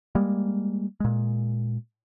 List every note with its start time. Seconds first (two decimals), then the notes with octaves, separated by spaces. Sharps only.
0.15 G3 G#3 A#3
1.00 A#2 G#3